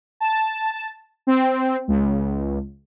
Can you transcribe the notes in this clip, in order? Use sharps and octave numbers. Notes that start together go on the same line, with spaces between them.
A5
C4
C#2